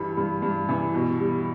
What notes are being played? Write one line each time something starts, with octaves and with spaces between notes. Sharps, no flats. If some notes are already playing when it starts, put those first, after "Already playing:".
Already playing: G2 E3 G3 B5
G2
G2
E3
B2
G3